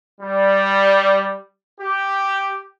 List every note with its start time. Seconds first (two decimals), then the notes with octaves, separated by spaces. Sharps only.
0.21 G3
1.80 G4